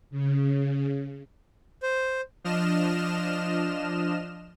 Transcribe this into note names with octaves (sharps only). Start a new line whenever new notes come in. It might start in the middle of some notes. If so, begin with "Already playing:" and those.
C#3
C5
F3 D4 D#5 F6 E7